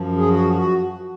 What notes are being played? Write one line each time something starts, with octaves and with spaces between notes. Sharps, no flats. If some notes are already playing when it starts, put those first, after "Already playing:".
Already playing: F#2 F3
G#4
F#4
F#4